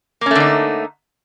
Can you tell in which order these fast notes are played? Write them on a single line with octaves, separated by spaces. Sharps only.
A#3 C#4 A3 D3 D#4